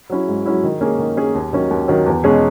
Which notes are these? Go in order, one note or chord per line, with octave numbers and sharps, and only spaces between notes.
F#3 C#4 E4
G#2
F#3 C#4 E4
D#3
A#3 C#4 G#4
D#3
A#3 C#4 G#4
D#2
D#3 F#3 C#4
D#2
D#3 F#3 C#4
E2
B2 G#3 C#4 G#4